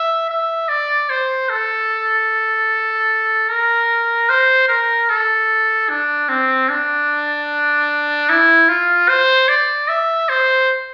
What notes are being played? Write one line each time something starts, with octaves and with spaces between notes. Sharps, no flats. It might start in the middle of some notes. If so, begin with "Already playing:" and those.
Already playing: E5
E5
D5
C5
A4
A#4
C5
A#4
A4
D4
C4
D4
E4
F4
C5
D5
E5
C5